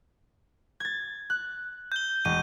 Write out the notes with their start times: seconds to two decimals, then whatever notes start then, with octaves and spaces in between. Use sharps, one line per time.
0.80 G#6 A6
1.30 F#6
1.92 G6 G7
2.25 E1 D#7